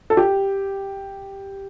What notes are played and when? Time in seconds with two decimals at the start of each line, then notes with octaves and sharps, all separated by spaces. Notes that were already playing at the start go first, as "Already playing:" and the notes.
0.10 A4
0.17 G4